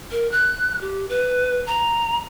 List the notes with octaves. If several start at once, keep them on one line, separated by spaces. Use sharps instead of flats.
A#4
F#6
G4
B4
A#5